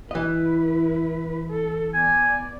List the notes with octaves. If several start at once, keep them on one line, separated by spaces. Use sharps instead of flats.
E3 E4 B4 D#5
A4
B3 D5 G#5